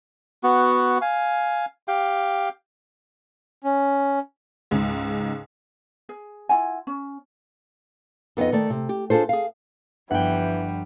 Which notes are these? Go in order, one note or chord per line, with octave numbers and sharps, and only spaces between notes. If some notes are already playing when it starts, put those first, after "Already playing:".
B3 F#4
F5 G#5
G4 F5 G5
C#4
C#2 G#2
G#4
E4 F4 F#5 G#5
C#4
F2 B3 C4 D#4 D#5
D#3 A3 D5
C3
G4
D4 F4 G#4 A4 C5
G#4 F5
G1 E3 F3 G3 F#5 G5